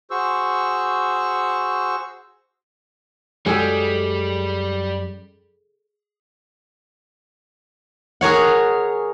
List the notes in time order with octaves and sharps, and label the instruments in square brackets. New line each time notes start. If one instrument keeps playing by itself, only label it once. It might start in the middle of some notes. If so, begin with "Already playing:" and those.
[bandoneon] F#4 G#4 C5 C#6 E6
[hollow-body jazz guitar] F#2 G#3 [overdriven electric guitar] G3 [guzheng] G#4 A4 G5
[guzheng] G#4 A#4 C#5 F#5